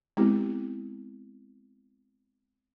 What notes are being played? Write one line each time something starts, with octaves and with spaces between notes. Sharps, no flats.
G#3 B3 C4 E4 G4